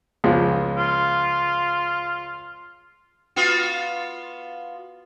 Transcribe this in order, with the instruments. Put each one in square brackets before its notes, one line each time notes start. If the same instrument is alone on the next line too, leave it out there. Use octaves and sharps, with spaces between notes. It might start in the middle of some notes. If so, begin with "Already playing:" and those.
[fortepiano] C#2 F3 G#3
[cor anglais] F4
[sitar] B3 F4 F#4